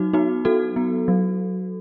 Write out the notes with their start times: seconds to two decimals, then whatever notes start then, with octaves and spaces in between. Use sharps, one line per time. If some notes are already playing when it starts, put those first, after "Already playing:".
Already playing: F#3 D#4 F#4
0.13 B3 D#4 F#4
0.45 F#3 F#4 A4
0.76 B3
1.08 F#3